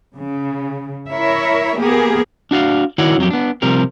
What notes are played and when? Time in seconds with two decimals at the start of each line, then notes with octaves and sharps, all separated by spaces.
0.15 C#3
1.10 E4 A#4 C#5 E5
1.78 A#3 B3 G4 G#4 A#4
2.51 D4 F#4 D5 F5
2.98 D#3 E4 F#4 C#5 D5
3.18 F2 F#3 G4
3.31 B3 D4
3.62 C3 F3 G3 A#4